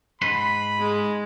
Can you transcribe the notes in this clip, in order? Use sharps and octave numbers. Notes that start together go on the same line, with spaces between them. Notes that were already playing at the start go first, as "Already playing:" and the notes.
G#2 B4 B5 C6
G#3